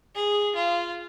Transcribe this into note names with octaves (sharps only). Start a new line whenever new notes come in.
G#4
F4